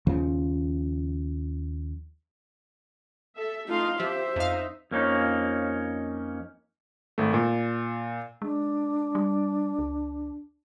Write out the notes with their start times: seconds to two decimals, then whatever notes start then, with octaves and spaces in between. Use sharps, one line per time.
0.07 D#2 C#3 F3
3.37 A4 E5
3.68 A3 D#4 F4 F5 C6
4.00 F3 G4 C5 E5
4.36 F2 D#4 F5
4.91 F2 A#3 C#4 D#4
7.18 G#1 A3
7.34 A#2
8.42 G#3 D4
9.15 G3
9.79 C#2